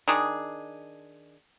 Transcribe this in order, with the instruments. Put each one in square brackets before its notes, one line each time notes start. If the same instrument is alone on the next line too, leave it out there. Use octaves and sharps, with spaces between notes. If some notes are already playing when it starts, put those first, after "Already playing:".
[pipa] D#3 D4 G#4